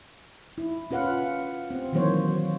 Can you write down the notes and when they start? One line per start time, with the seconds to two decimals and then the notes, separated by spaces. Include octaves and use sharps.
0.58 E4
0.91 C#4 F4 B4 F5 F#5
1.71 C4
1.92 D#3 E3 F#3 A#3 C5 C#5